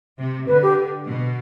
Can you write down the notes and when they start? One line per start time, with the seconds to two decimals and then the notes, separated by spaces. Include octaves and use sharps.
0.18 C3
0.47 D3 B4
0.62 G4
1.07 B2